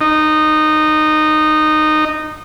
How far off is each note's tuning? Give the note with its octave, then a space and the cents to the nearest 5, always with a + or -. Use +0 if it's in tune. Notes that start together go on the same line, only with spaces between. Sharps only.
D#4 -15